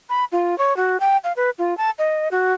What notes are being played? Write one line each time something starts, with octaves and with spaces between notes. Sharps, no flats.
B5
F4
C#5
F#4
G5
F5
B4
F4
A5
D#5
F#4